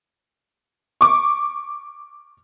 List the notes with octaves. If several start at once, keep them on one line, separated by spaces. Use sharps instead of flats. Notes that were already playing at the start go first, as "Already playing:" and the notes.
C#6 D6